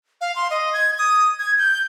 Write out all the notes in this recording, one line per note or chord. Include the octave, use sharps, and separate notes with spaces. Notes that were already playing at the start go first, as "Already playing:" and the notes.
F5
C6
D#5
G#6
D#6
G#6
G6